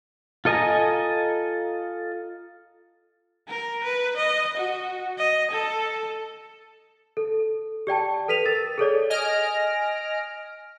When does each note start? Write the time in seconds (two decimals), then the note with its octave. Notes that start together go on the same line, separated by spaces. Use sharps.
0.45 F4 A4 D#5 G#5 A#5
3.48 A#4
3.84 B4
4.16 D#5
4.57 F#4
5.18 D#5
5.51 A4
7.17 A4
7.87 G4 D5 G5 A5
8.28 A4 B4 B6 D#7 F7
8.46 A#4 A6
8.78 G#4 A4 C#5 D5
9.10 D#5 G#5 F6 A#6 D7